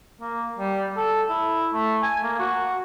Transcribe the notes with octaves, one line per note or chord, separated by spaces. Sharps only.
A#3
G3
A4
E4
A3
G#5
A#3
F#4